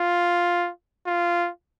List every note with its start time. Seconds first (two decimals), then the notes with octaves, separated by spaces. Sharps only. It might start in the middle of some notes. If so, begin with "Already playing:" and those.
Already playing: F4
1.07 F4